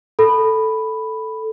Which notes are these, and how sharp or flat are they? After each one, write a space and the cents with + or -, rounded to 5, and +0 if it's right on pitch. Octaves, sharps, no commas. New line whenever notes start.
A4 +0 B5 +0